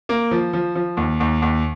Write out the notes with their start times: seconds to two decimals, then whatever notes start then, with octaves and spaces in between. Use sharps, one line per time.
0.09 A#3
0.31 F3
0.53 F3
0.75 F3
0.97 D#2
1.20 D#2
1.42 D#2